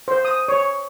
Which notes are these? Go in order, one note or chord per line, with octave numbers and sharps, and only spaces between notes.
C5
D#6
C#5